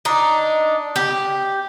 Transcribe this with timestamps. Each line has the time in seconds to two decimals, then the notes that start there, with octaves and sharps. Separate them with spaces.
0.05 D4 D#4
0.96 G4